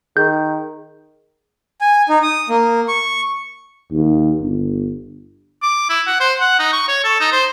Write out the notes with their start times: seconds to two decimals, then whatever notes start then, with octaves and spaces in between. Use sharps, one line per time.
0.17 D#3 G#4 G6
1.81 G#5
2.09 D#4
2.23 D#6
2.49 A#3
2.88 C#6
3.92 D#2
4.42 G1
5.62 D6
5.89 E4
6.06 F#5
6.20 C5
6.40 F#5
6.59 D#4
6.73 C#6
6.88 C#5
7.04 A4
7.20 D#4
7.32 C5